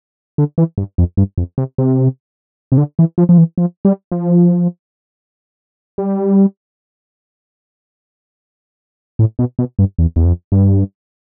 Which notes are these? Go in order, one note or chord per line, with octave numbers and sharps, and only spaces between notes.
D3
E3
G2
F2
G2
F2
C3
C3
C3
D3
E3
F3
F3
E3
F3
G3
F3
G3
A2
B2
B2
G2
E2
E2
F2
G2